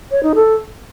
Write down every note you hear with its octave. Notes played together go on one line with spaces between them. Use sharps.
C#5
D#4
A4